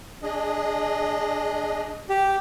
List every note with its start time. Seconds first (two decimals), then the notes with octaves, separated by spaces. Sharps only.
0.23 D4 G#4 D#5
2.09 G4